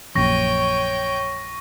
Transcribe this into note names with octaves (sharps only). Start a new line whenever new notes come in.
A#1 F#2 C#5 G5 C#6 A#6